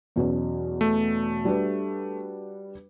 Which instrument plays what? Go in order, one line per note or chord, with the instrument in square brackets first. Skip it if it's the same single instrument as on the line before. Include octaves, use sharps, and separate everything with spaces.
[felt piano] E2 B2 F#3 C#4
[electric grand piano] A3
[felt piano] G3 D4 F#4 B4